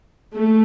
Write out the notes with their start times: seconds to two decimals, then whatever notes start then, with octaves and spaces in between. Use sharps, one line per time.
0.33 A3